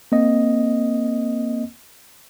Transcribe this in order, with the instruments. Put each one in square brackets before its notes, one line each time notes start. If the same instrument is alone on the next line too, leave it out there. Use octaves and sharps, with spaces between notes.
[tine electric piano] A#3 C4 D#5